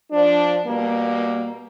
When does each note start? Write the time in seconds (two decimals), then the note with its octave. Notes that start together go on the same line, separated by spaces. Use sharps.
0.12 F3 D4
0.65 B2 G3 A#3